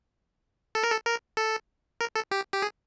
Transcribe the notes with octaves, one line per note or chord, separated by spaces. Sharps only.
A4
A#4
A4
A#4
A4
A#4
A4
G4
G4
G#4